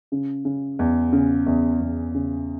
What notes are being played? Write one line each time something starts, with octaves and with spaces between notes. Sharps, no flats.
C#3
C#3
E2
C#3
E2
E2
C#3